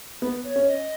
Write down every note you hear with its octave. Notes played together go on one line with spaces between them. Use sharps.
B3 B4
C#5
C#4
D#5